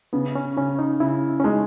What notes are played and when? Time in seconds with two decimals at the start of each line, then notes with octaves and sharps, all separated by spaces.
0.13 C#3 B3
0.35 C#4
0.57 C#3 C#4
0.79 D#4
1.00 C#3 E4
1.40 C#4
1.44 G#3 D#4